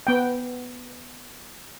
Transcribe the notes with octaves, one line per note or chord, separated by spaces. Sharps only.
B3 G5